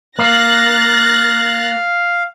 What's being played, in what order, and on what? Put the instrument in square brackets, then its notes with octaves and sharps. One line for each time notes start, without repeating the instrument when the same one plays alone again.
[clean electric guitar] A#3 [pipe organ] F5 [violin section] F#6 A6 A#6